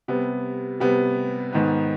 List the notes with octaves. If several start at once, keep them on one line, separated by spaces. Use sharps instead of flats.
C3 G3 B3
C3 G3 B3
G#2 D#3 B3